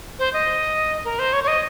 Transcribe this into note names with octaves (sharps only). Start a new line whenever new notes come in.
C5
D#5
A#4
C5
C#5
C#5
D#5